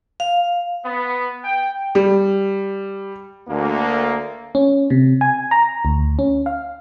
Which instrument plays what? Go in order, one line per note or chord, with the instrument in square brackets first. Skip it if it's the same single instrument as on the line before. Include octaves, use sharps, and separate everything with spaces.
[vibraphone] F5
[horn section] B3
G5
[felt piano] G3
[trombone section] D2 A#3
[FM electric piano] C#4
C3
G#5
A#5
D2
C#4
F5